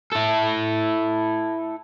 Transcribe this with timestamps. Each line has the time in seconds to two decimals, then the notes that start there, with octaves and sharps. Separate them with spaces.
0.12 E4 A4